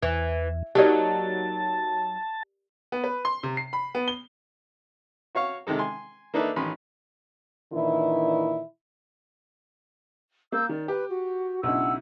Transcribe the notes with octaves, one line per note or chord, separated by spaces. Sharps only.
E2 E3
F#3 A#3 D#4 G4 A#4 D5 A5
B3
B4
C6
C3
C7
B5
B3
G7
F#4 C#5 F5 C#6
C3 D#3 G#3 A4
G#5 C6
A#3 D4 D#4 A4 B4 E5
A1 D#3 C#4 D#4 B5 C6
A#2 D#3 E3 D4 E4
A#3 E6 G6
D#3 D5
G4 B4
F#4
B1 C#3 D4 E4 F#5 E6